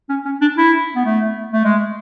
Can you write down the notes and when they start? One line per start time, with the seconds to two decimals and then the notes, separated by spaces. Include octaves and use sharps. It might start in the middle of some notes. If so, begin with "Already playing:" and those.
0.09 C#4
0.25 C#4
0.41 D4
0.58 E4
0.96 B3
1.05 A3
1.53 A3
1.64 G#3